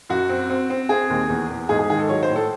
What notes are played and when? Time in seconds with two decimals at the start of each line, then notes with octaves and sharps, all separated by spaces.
0.09 F#2 F#4
0.29 C4
0.50 C4
0.70 C4
0.89 C4 G#4
1.10 D#2
1.29 E2
1.50 E2
1.69 G#2 G#4
1.79 G#4
1.90 D#3 G#4
1.99 A4
2.09 F#3 C#5
2.23 C5
2.29 A2
2.36 A4